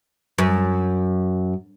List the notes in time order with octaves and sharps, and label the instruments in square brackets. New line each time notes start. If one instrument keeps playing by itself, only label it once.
[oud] F#2